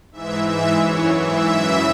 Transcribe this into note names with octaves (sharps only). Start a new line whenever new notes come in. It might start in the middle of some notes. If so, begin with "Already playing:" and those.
G#2 E3 E5
G#2 E3 E5
F#2 E3 C#5
G#2 E3 E5
F#2 C#3 E3